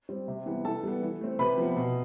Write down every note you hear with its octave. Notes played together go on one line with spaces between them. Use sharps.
G3 C4
C3
E3 G3 B3
E3 A4 A5
G3 B3
E3
A3 C4
C3 B4 B5
F3 B3
B2